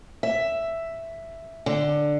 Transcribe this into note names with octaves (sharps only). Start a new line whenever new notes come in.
E5
D3